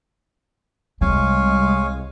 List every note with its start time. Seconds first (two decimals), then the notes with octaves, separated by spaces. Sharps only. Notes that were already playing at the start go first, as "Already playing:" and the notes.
1.01 C2 G3 G#3 C#5 F5 G#5